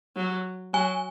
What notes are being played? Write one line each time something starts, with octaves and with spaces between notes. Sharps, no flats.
F#3
F#3 G#5